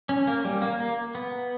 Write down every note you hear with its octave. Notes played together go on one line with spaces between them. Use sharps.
C#4
A#3
G3
A#3
A#3
B3